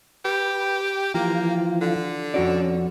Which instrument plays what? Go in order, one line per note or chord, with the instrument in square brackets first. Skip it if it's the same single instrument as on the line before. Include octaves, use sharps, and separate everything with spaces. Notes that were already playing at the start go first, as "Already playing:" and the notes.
[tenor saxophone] G4 [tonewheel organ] B4
[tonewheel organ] E3 F3 F4 [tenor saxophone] A#3 [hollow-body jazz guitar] G4
[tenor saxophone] D3
[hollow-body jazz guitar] F2 F#4 D5 [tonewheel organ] C#4